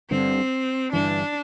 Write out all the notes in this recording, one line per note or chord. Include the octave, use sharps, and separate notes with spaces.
G1 G2 D3 C4
G1 G2 E3 D4